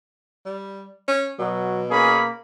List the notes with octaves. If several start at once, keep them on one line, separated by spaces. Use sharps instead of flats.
G3
C#4
B2 F#3
A#3 C#4 G#4 B5